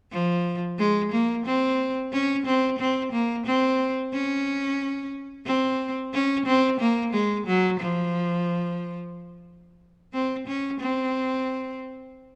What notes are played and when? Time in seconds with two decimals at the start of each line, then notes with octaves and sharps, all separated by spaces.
0.11 F3
0.78 G#3
1.12 A#3
1.46 C4
2.12 C#4
2.46 C4
2.79 C4
3.12 A#3
3.46 C4
4.13 C#4
5.46 C4
6.13 C#4
6.46 C4
6.80 A#3
7.13 G#3
7.47 F#3
7.80 F3
10.13 C4
10.47 C#4
10.80 C4